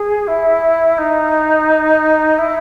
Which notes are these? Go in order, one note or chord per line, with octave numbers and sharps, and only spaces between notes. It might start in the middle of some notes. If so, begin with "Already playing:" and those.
Already playing: G#4
E4
D#4
E4